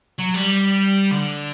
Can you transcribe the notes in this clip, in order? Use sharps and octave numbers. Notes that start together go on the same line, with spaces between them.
F#3
G3
D3